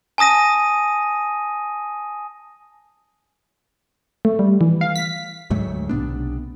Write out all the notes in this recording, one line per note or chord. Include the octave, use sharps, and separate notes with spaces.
G#5 A5 D#6 A#6 D#7
A3
G3
E3
F5
B6
D2 G#2 F#3 A3
B1 C3 B3 D4